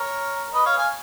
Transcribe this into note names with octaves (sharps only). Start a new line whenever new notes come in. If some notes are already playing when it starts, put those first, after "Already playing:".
Already playing: A#4 C#5
B4 D#5
C#5 F5
F5 G#5